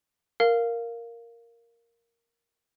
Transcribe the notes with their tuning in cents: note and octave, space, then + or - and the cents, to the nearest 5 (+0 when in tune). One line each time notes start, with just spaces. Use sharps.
A#4 +0 F5 +0